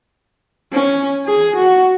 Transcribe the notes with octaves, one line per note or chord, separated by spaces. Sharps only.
C#4
G#4
F#4